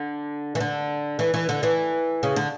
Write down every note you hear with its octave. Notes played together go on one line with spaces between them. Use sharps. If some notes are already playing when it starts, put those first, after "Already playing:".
Already playing: D3
E3
D3
E3
E3
D3
E3
C#3
D3